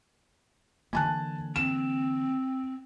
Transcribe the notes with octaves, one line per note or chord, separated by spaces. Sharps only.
D3 E3 A#3 G#5 A5 F#6
C4 E7